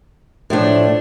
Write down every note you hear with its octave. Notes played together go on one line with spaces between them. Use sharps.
A2 F3 A3 D4